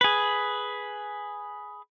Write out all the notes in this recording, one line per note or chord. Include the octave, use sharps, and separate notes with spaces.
G#4 B4